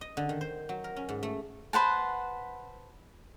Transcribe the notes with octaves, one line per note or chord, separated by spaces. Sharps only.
D#5
D3
D#3
C5
F#3
A#4
C#4
G#2
A3
B4 C5 F#5 A5